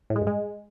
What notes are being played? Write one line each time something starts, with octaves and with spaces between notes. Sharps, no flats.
A2
G#3
G2
G#3